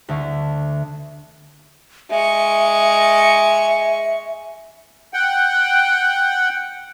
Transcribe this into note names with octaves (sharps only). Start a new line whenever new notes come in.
D2 D3
G#3 E5 C#6
F#5 G5